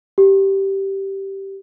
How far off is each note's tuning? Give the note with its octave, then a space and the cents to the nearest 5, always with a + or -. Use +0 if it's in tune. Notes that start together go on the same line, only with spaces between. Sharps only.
G4 -10